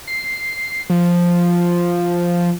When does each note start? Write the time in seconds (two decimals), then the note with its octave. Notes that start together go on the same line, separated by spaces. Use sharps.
0.07 C7
0.90 F3